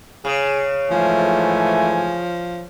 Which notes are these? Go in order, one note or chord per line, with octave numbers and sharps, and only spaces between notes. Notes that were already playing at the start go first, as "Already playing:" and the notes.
C#3 G#4
G#2 E3 F3 A3 G#5